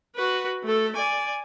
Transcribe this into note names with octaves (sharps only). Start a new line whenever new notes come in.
F#4 B4
A3 A4
D5 G#5